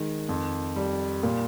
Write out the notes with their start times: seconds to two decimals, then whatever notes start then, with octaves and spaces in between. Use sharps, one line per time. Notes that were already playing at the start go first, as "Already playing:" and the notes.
Already playing: D#3 G#3
0.29 F2
0.76 G3
1.23 A#2